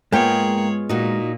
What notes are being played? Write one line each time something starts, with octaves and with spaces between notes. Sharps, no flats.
G#2 G#3 A#3 B3 F4 G#4 C#5 G5
A#2 D#4 F#4